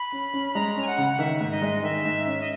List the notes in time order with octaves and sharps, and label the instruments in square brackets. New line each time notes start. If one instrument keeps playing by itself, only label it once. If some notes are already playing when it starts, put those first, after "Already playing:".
Already playing: [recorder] B5
[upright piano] C#4
C#4
[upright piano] G#3 [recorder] A#5
[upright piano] C#4
[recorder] G#5
F#5
[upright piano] C#3
[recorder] F#5
[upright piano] D#3 [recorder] E5
[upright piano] G#2
[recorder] D#5
[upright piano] G#3
[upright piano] D#3 [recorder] E5
[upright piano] G#2
C#4
[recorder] D#5